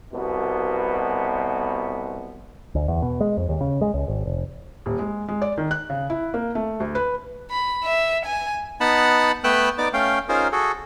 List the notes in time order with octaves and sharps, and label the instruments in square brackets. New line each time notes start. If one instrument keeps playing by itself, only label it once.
[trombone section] C2 B2
[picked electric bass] D2
E2
B2
G#3
F2
D#2
C#3
G#3
C#2
G#1
F1
[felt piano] D#1
G#3
G#3
D5
D#3
F#6
C#3
E4
A#3
A3
D2
B4
[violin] B5
E5
G#5
[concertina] B3 D#4 F#5 A5 B5
A3 B3 B4 G5 E6 F#6
B3 D#4 D5 D6
A3 C#4 F5 G5
C#4 D#4 F4 G#4 A#4 C5
F#4 G#4 A4